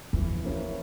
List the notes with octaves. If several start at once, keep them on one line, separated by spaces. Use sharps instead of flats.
F2 E3
A#3 C#4 E4